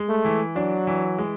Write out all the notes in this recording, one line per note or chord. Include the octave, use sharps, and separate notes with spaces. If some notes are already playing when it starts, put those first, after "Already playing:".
Already playing: G#3
A3
E3
F#3 D4
E3
G#3